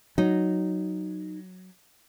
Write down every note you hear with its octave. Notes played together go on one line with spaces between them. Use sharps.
F#3 D#4